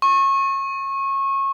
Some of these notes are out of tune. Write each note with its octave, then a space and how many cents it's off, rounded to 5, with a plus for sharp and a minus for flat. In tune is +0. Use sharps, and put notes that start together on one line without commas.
C#6 -25